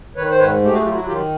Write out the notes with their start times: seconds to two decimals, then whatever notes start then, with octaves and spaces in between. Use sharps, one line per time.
0.17 D#3 B4 C#5
0.30 C5
0.39 G#2 B4 C#5
0.62 A3 G4
0.73 F#4 G#4
0.84 F#3 F4 G4
0.95 E4 F#4
1.06 D#3 F4 G4